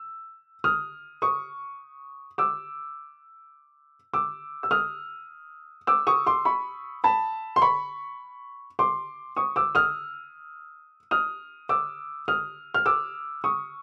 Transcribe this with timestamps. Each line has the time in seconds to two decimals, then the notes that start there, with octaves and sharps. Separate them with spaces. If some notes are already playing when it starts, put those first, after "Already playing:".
Already playing: E6
0.64 D#6 F6
1.22 C#6 D#6
2.38 D6 E6
4.13 D6 E6
4.63 E6
4.71 D#6 F6
5.87 D6 E6
6.07 C#6 D#6
6.26 C6 D6
6.45 B5 C#6
7.04 A5 B5
7.56 C6
7.62 B5 C#6
8.79 C6 D6
9.37 C#6 D#6
9.56 D6 E6
9.75 D#6 F6
11.11 D#6 F6
11.69 D6 E6
12.28 D#6 F6
12.74 F6
12.86 D6 E6
13.44 C#6 D#6